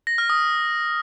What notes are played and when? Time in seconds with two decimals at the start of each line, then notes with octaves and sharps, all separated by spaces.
0.07 A#6
0.18 F6
0.30 D#6